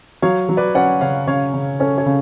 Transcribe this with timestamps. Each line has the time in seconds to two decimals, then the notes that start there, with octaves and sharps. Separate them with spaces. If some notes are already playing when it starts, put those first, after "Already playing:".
0.22 F#3 C#5 F5
0.49 F#3
0.57 B4 D5
0.75 C#4 D5 F#5
1.01 C#3 C#5 F5
1.27 C#3 C#5 F5
1.54 C#3
1.80 C#4 A4 C#5
1.98 A4 C#5
2.06 C#3